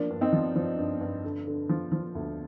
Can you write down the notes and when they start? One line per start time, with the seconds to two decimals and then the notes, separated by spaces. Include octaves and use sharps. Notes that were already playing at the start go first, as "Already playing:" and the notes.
Already playing: F3 A#3 D4
0.10 G2
0.21 C4 D#4
0.33 F3
0.56 F3
0.78 G2
1.01 G2
1.24 D3
1.47 D3
1.69 F3
1.92 F3
2.15 D2